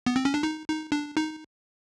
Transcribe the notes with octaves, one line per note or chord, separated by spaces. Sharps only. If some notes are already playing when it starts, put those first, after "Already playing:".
B3
C4
C#4
D4
D#4
D#4
D4
D#4